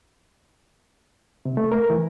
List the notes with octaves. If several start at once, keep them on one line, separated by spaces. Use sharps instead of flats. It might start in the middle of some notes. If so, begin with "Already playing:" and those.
C3
A3
A#4
E3